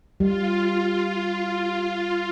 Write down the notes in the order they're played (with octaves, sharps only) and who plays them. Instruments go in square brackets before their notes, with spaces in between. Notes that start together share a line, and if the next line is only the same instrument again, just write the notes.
[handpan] G3 [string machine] F4